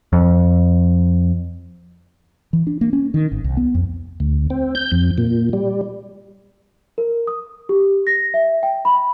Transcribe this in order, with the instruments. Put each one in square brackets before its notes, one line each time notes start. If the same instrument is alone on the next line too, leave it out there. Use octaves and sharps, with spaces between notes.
[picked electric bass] F2
[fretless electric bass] E3
D4
A#3
C#4
D#3
G#1
C2
B3
F2
[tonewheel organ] D2
C4
G6
F2
A#2
G3
[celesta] A#4
D#6
G4
A#6
E5
G5
B5